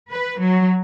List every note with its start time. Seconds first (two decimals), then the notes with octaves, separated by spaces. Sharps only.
0.10 B4
0.39 F#3